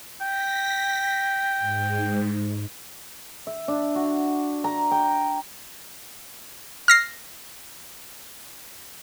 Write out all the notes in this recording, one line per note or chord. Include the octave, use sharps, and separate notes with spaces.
G5 A#6 B6
G#2
E5
D4
F#4
A#5
G5
F6 A#6 C7